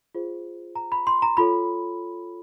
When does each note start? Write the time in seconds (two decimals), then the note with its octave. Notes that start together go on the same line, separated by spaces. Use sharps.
0.15 F4 G#4 C5
0.76 A#5
0.92 B5
1.07 C6
1.22 A#5
1.37 F4 A4 C#5 B5